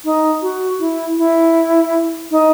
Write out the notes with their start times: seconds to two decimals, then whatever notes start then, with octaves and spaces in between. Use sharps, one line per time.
0.05 D#4
0.42 F#4
0.80 E4
1.18 E4
2.31 D#4